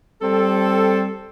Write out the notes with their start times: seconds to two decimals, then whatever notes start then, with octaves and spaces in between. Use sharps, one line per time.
0.22 G3 C4 A4